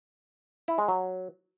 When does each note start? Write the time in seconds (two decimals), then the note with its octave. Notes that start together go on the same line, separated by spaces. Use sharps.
0.68 E4
0.78 G#3
0.88 F#3